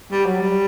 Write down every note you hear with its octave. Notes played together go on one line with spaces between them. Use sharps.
G3
F#3
G3